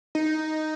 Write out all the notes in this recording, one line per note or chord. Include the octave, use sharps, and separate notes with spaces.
D#4